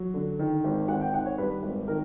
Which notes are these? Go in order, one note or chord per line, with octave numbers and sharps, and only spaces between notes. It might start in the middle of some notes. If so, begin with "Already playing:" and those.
Already playing: F#3
D3
D#3
G#1
G#1 F#5
G5
D#3 F#5
C#5
G2 B4
G#1
D#3 A#4